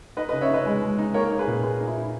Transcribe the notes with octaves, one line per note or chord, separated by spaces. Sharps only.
D#4 B4 D#5
B4 D#5
C#3
C#5 E5
D#4 B4 D#5
G#3
G#3
D#4
A#3 A#4 C#5
D#4
G#4 B4
A#2
A#3 G#4 B4
D#4
E4
D#4